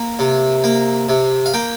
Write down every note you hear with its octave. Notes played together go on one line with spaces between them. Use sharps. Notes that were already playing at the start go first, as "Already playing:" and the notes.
Already playing: A#3
C3
A#3
C3
F5
A#3 G5